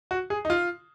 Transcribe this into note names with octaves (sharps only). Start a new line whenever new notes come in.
F#4
G#4
D#4
F4